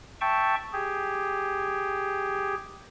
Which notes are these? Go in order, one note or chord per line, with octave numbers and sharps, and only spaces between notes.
E5 G5 A5 C#6
G4 G#4